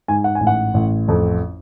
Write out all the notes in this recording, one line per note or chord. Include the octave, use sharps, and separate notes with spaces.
G#2 G#5
F#5
G#5
A1
F#5
A1
F2